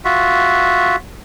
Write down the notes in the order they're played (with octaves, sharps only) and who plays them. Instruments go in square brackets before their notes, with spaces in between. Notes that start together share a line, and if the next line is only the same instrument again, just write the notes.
[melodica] F4 F#4 E5